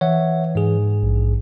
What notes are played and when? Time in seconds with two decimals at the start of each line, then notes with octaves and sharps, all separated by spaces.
0.01 E3 C#5 E5 F#5
0.55 G#2 G#4
1.03 A#1